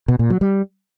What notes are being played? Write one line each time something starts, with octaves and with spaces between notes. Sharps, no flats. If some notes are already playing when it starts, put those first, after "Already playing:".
B2
A#2
F#3
G3